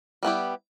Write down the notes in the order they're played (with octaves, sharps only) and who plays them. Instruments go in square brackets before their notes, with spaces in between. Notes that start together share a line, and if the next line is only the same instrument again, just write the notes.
[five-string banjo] G3 B3 E4 G4